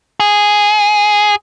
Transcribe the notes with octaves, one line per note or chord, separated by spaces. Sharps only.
G#4